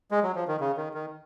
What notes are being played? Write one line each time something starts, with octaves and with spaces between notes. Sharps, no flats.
G#3
F#3
F3
D#3
C#3
D#3
D#3